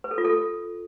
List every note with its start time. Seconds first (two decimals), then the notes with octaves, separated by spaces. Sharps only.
0.04 B4
0.11 A4
0.18 F4
0.25 A4